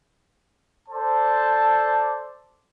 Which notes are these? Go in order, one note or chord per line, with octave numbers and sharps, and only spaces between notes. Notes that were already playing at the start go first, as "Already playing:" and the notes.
A4 C5 D5 A5